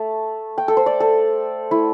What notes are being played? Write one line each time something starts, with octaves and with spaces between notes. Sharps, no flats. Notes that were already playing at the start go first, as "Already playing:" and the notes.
Already playing: A3 A5
G5
A4
C5
D5
A4
A3 E4